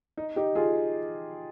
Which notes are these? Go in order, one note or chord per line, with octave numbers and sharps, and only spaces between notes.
D#4
D#4 G4
F4 G#4